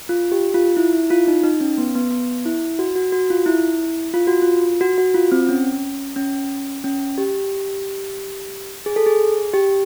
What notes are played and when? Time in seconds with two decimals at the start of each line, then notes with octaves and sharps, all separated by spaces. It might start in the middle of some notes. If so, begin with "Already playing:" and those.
0.09 F4
0.32 G4
0.54 F4
0.77 E4
0.93 E4
1.10 F4
1.27 D#4
1.43 D#4
1.61 C#4
1.78 B3
1.95 B3
2.11 B3
2.46 E4
2.79 F#4
2.96 F#4
3.12 F#4
3.30 F4
3.46 E4
4.14 F4
4.27 F#4
4.42 F4
4.81 F#4
4.98 F#4
5.14 F4
5.32 C4
5.49 C#4
6.16 C#4
6.84 C#4
7.18 G4
8.86 G#4
8.96 A4
9.06 G#4
9.54 G4